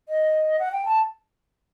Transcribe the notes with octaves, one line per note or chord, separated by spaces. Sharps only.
D#5
F#5
G5
A5